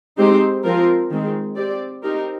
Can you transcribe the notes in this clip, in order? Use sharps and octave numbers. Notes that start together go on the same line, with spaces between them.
G#3 C4 D#4 G4 C5
F3 C4 F4 A#4
D#3 G#3 C4
C4 G4 D5
C4 D#4 G4 A#4